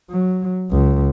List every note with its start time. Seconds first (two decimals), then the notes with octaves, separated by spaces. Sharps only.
0.11 F#3
0.71 C#2